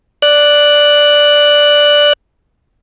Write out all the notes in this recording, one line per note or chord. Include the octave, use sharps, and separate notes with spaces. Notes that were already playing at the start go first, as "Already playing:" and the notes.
D5 F#6